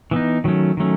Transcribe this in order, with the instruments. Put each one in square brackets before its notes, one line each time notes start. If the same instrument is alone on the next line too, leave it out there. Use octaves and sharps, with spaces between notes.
[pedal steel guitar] E3 B3 D#4
D#3 F#3 A3 C#4
D#3 F#3 A3 C#4